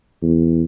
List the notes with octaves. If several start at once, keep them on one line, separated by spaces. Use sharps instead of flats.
E2